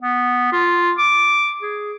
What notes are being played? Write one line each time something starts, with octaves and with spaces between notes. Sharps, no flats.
B3
F4
D6
G#4